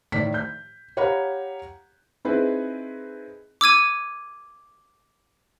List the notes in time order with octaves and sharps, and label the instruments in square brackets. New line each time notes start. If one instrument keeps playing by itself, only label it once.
[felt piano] A2 D#3 D5 B6
G6
G4 C#5 F5 F#5 A#5 B5
C4 D#4 E4 G#4 B4
[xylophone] D6 E6 G#6 D#7